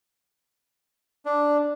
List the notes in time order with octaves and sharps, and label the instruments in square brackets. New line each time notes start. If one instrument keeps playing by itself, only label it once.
[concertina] D4